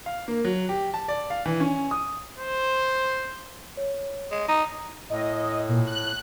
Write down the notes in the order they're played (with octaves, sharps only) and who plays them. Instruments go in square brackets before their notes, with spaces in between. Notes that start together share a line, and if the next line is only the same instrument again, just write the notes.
[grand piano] F5
A#3
F#3
G4
A5
D5
F5
E3
C#4
D#6
[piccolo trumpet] C5
[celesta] C#5
[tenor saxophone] G#3
[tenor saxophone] D#4 [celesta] A#5
[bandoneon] A2 [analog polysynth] D#5
[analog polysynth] A#2
F#6